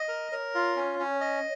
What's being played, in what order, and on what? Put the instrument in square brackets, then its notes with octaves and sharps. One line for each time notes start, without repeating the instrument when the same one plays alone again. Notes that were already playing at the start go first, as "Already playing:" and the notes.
Already playing: [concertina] D#5
A#4
[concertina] A#4 [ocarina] C#5
[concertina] F4
C#4
C#4
D#5